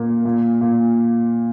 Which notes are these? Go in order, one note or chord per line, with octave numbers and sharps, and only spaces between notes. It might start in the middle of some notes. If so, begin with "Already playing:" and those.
Already playing: A#2 A#3
A#2
A#2